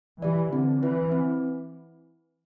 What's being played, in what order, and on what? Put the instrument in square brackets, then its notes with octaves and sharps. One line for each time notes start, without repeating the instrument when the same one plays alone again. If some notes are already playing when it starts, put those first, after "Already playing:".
[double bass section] E3 [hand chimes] G4 D5
[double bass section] D3 [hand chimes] C4
[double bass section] E3 [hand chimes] E4 B4
[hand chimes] C4